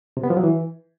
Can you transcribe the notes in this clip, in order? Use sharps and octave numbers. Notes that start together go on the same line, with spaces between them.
C3
B3
F3
F#3
E3